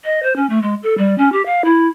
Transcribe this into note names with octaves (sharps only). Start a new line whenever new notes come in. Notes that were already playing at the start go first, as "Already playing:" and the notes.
D#5
C5
C#4
A3
G#3
A4
G3
C#4
G4
F5
E4